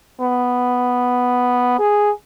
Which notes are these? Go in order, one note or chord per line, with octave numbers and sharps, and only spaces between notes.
B3
G#4